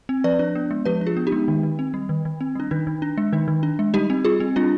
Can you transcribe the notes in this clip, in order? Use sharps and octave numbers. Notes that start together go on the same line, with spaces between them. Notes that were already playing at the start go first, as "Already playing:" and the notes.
C4
F3 B4 D5
D4
B3
G#3
F3 G4 B4
D4
F4 G#4
B3
D#4 G4
G#3
D#3
D#3
C4
G3
D#3
D#3
C4
G3 D4
D#3 D#4
D#3
D4
G#3
D#3 D#4
D#3
D4
G#3
G3 D#4 G4
C4
G3 F4 G#4
C4
G3 D4 F4